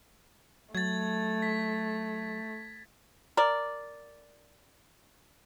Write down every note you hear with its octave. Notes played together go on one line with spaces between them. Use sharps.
F#3 A3 G#6 A6
B6
A#4 D5